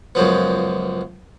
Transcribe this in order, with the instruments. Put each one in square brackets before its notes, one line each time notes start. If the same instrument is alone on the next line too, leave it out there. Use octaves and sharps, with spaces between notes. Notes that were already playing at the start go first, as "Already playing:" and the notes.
[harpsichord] C#2 F#2 F3 B3